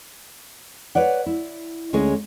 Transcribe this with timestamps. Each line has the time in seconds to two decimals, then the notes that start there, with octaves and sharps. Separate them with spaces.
0.95 B4 C#5 D5 F#5
1.26 E4
1.93 D2 G#3 C#4 G#4 C#5 D#5